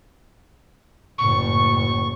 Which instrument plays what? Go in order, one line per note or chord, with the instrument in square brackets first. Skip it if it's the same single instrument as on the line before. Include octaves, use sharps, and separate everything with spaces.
[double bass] F#1 A2 [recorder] C#6